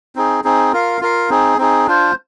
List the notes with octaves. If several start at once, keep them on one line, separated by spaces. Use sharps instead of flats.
C4 D#4 G#4
C4 D#4 G#4
F4 A#4 F5
F4 A#4 F5
C4 D#4 G#4
C4 D#4 G#4
D4 F4 C5